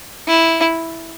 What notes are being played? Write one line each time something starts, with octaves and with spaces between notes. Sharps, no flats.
E4